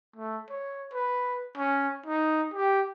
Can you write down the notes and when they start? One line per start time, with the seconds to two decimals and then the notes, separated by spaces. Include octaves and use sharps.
0.16 A3
0.50 C#5
0.94 B4
1.57 C#4
2.06 D#4
2.54 G4